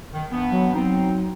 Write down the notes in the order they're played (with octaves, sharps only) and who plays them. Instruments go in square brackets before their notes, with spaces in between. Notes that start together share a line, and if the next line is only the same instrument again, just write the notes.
[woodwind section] D#3
G2 E3 B3
[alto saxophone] F#3
[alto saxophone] F#3 [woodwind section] C4 D#4